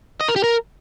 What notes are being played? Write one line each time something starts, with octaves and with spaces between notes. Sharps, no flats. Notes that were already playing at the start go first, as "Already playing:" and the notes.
D#5
A#4
G4
A#4